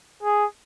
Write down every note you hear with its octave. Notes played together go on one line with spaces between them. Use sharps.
G#4